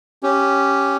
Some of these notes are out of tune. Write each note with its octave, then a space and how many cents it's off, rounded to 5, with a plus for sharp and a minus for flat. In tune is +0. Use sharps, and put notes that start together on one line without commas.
C#4 +0 G4 -10